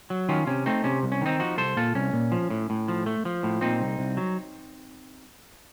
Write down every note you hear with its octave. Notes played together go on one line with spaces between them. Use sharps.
F#3
D#3 C#4 F4
C3 C#4
A3 C4 D#4
C3 C#4
C2
C#4
D#3 C4 D#4
F3 D#4 F#4
C2 A4 C5
A#2 F4 A4
C2 C#4
A#2
F3
A2
A2
F3
A3
F3
A2
A#2 C4 D#4
C2
C2
F#3